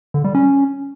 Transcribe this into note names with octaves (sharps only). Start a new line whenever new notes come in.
D3
G3
C#4